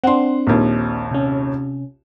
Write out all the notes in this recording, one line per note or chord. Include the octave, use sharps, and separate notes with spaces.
C4 D4 F#5 C6
A#1 D#2
C3 C#4